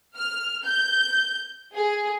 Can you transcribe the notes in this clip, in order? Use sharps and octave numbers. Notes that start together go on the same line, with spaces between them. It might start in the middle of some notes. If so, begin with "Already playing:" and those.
F6
G6
G#4